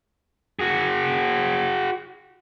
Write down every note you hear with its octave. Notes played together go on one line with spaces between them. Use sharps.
F#4 G#4